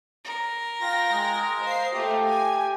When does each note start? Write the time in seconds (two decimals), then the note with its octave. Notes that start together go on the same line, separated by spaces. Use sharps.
0.24 A#4
0.81 F4 G5 A#6
1.12 G#3
1.62 C5 D#5 F5 C7
1.93 A3 F4 G4
2.27 G#5